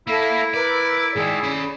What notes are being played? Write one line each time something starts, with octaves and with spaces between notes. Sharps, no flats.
A#3 E4 A4 E5 B5
A#4 B4 D5
G#2 D#3 G#4 D5
C#4 B5